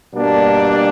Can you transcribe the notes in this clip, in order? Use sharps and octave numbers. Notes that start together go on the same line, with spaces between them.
B2 G3 A#3 D4